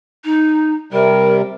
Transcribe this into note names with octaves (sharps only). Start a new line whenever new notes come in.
D#4
C3 G3 A#4